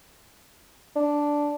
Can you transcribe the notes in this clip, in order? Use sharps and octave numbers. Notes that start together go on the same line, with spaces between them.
D4